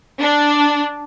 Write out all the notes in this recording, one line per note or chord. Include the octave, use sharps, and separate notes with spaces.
D4